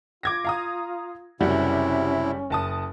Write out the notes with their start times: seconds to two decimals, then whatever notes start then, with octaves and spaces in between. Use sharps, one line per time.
0.23 F4 D6 G#6 A#6
0.45 F5 A#5 D#6
1.40 F#1 C3 G3 C#4 E4 F#4
2.50 F#1 A5 D#6